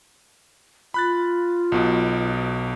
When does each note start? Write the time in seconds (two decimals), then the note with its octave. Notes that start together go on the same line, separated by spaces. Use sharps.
0.94 F4 B5 F#6 A6
1.72 B1 B2